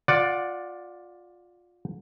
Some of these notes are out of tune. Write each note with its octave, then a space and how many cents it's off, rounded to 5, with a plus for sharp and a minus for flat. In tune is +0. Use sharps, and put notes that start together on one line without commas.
F4 +20 D5 +0 F#5 +0